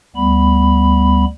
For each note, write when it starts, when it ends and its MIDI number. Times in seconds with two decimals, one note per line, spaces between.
0.16 1.25 38
0.16 1.25 55
0.16 1.25 59
0.16 1.25 83